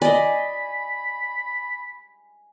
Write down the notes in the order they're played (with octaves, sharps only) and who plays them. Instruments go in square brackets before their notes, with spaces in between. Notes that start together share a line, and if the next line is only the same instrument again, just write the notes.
[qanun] D5 D#5 [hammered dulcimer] G#5 [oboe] B5